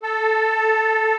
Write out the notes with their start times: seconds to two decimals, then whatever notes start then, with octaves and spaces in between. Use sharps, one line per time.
0.03 A4